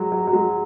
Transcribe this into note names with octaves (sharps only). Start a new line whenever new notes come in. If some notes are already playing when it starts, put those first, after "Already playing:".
Already playing: F#3 G#3
F#3
F#3
G#3